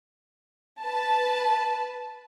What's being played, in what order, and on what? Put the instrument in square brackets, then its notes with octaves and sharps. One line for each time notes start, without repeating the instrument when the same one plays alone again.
[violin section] B4 A5